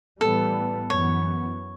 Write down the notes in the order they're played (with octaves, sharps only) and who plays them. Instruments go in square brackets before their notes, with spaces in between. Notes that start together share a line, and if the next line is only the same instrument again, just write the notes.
[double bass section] A2 E3 G3 B3 [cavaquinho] A4
[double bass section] F#2 E3 B3 [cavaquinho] C#5